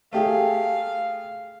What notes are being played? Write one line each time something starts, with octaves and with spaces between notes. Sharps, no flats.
A3 G4 G#4 F5